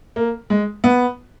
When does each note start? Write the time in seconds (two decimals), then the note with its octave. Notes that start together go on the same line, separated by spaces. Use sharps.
0.16 A#3
0.50 G#3
0.84 B3